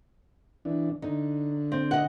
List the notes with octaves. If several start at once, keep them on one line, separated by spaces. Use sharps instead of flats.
E3 D4
D3 D#4
C4
D#5 F#5